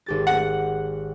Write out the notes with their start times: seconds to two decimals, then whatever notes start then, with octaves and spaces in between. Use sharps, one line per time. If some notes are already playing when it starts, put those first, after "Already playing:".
0.06 G#1 G4 A6
0.27 F#5